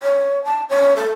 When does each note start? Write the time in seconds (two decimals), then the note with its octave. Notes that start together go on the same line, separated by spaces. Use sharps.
0.02 C#5
0.44 A5
0.69 C#5
0.96 A4